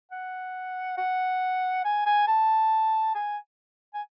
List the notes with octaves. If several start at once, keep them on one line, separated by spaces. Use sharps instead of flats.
F#5
F#5
G#5
G#5
A5
G#5
G#5